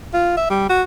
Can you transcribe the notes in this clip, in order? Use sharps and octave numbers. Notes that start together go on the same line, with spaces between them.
F4
E5
G3
F#4